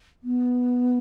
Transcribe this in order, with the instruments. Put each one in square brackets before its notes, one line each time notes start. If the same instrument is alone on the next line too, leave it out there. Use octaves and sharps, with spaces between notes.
[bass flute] B3